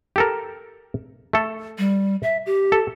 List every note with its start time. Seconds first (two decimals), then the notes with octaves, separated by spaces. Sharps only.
0.16 G4 A4 A#4
1.33 A3 A4
1.78 G3
2.23 E5
2.46 G4
2.72 A4